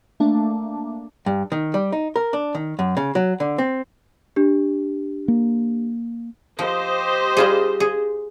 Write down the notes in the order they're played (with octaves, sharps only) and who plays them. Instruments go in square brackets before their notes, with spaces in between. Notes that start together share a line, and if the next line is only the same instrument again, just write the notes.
[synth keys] A3 A#3 D4
[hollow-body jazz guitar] G2
D#3
G3
D#4
A#4
D4
D#3
F#2
C#3
F#3
D3
C4
[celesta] D4 G4
[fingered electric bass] A#3
[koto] F3 [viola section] G4 C5 D#5
[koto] G3 F4 G#4
G#4